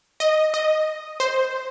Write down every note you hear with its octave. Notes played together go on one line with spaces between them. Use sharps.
D#5
D#5
C5